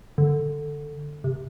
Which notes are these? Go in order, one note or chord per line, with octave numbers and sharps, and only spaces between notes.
D3
C3